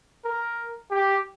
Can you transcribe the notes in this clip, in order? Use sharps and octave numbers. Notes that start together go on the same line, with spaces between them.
A#4
G4